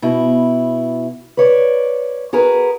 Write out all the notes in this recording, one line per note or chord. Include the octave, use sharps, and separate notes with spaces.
B2 E4
B4 C#5 D5
F#4 G#4 A#4 B4